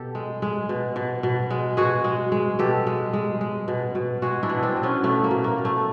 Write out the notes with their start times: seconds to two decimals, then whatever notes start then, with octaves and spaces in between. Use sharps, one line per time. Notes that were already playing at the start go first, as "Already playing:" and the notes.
Already playing: B2 G4 A4
0.15 G#3
0.42 G#3
0.69 B2
0.96 B2
1.23 B2
1.51 G#3
1.77 B2 F#4 G#4
2.04 G#3
2.32 G#3
2.59 B2 G4 A4
2.87 G#3
3.13 G#3
3.41 G#3
3.68 B2
3.95 B2
4.22 G#3 F#4 G#4
4.43 D4 E4
4.50 B2
4.63 C4 D4
4.77 B2
4.83 B3 C#4
5.03 B2 A3 B3
5.24 A#3
5.31 B2
5.44 A#3
5.58 B2
5.65 A3